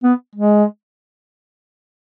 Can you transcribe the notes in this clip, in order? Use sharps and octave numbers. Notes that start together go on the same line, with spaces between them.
B3
G#3